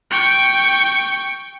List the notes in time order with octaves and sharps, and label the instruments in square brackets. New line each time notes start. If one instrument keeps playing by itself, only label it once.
[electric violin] G5 C#6